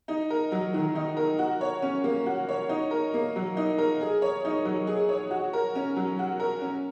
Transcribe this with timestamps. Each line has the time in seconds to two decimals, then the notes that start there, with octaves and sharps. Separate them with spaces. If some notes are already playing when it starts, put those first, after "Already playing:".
0.08 D#4
0.30 A#4
0.52 F#3
0.74 D#3
0.95 D#4
1.17 A#4
1.39 F#4
1.61 C#5
1.82 C#4
2.04 A#3
2.26 F#4
2.49 C#5
2.69 D#4
2.91 A#4
3.14 A#3
3.36 F#3
3.57 D#4
3.78 A#4
4.01 G#4
4.22 C#5
4.45 D#4
4.65 F#3
4.87 G#4
5.09 C#5
5.31 F#4
5.53 A#4
5.75 C#4
5.96 F#3
6.19 F#4
6.40 A#4
6.61 C#4